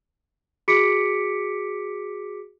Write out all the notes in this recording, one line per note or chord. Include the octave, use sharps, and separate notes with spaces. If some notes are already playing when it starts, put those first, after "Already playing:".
F#4 G#4 D6 B6 C#7 D7